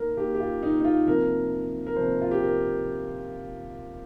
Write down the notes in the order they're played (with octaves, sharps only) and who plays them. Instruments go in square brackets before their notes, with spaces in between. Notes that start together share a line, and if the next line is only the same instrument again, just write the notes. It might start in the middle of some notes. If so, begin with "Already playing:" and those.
Already playing: [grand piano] D#3 A#3 A#4
D#3 A#3 G4
G4
F4
D#4
D#4
F4
C3 F3 A#3 A#4
A#4
C3 F3 A#3 C5
F4
G4
A#4